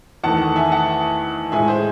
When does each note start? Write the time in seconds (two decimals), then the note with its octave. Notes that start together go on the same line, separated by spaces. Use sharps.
0.24 E2 D#3 A3 F#5 A5
0.56 E5 G#5
0.72 F#5 A5
1.52 A2 G#3 E5 G#5
1.68 G#4 C5